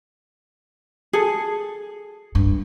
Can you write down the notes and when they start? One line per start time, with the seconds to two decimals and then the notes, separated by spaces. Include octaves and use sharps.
1.13 G#4 A4
2.35 G2